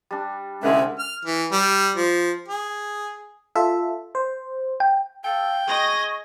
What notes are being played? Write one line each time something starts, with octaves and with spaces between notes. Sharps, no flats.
G3 D4
C2 D3 G#3 C4 C#4 G#4 B4 E5
F6
E3
G3
F3
G#4
F4 A4 E5
C5
G5
A4 F5 G5
G#4 D#5 C#6 A#6